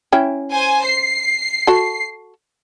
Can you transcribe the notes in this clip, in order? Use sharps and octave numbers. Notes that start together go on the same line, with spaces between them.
C#4 E4 G5
C5 G#5
C7
F#4 A4